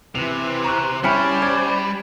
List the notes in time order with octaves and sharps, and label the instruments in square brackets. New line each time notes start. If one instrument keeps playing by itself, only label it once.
[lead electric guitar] C3 [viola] E3 B4 [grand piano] F7
[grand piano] A#5 C#6 F#6
[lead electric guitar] G3 [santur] C#4 G5 B5 [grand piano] E4 C#7 [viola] C5 A5
[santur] D5 [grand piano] G#6